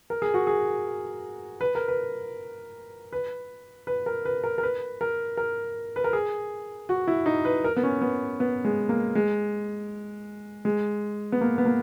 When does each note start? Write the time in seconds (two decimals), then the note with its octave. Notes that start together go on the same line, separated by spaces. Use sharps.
0.10 A#4
0.22 G#4
0.34 F#4
0.47 G#4
1.61 B4
1.75 A#4
1.88 B4
3.13 B4
3.87 B4
4.06 A#4
4.25 B4
4.44 A#4
4.58 A#4
4.63 B4
5.01 A#4
5.37 A#4
5.96 B4
6.04 A#4
6.13 G#4
6.89 F#4
7.08 E4
7.26 D#4
7.45 B4
7.64 A#4
7.76 B3
7.83 C#4
8.01 B3
8.40 B3
8.65 G#3
8.89 A#3
9.15 G#3
10.65 G#3
11.32 B3
11.41 A#3
11.58 B3
11.65 A#3